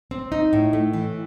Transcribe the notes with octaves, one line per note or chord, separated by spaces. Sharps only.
C4
D#4
A2
A3
E3